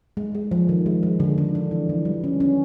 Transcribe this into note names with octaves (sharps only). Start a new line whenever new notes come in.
G#3
G#3
F3
D#3
G#3
G#3
D3
D4
D4
E3
E3
G3
C#4
C#4